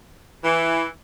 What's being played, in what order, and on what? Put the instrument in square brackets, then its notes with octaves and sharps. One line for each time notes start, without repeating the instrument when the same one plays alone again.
[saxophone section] E3